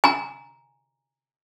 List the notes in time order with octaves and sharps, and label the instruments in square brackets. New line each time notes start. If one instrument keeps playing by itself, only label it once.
[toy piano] G#5 A#5